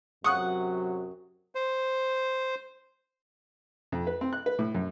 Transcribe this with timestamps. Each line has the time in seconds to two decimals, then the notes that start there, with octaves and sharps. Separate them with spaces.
0.24 F#2 C3 F#3 F#5 C#6 D#6 F#6
1.55 C5
3.92 F2
4.07 B4
4.21 C4
4.33 F#6
4.46 B4
4.59 A2
4.75 F#2